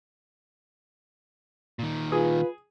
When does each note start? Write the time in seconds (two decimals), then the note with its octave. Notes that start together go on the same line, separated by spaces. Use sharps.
1.79 A#2 D#3
2.12 F4 G#4 B4